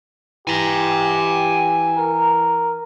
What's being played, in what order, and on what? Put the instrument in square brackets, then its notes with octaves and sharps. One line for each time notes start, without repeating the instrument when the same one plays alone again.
[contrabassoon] E3 [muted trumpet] G4 [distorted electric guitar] G#5 A#5
[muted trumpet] A#4